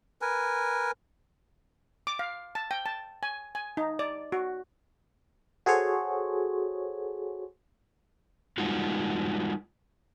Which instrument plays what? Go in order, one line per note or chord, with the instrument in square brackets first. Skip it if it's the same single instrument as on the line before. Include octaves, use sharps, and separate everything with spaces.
[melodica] A#4 B4 G#5
[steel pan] D6
F5
A5
G5
A5
G#5
G#5
D#4
D5
F#4
[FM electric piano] F#4 G#4 A4 C5 C#5
[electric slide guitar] G3 G#3 D#4 F4 F#4